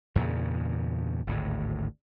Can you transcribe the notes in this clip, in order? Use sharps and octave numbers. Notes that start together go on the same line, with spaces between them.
E2 G2 A#2 C#3
G#1 D2 A2